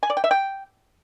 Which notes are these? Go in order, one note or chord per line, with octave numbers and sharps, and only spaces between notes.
G#5
D5
G5
E5
G5